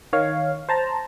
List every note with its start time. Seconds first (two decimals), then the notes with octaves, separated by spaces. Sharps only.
0.13 D#3 C#5 F5
0.69 C5 A5 A#5